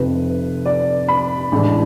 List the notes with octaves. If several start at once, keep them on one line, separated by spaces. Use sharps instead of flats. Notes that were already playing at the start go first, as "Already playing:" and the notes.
Already playing: F1 F2 C3 B4
D5
B5
A1 A2 G#3 D4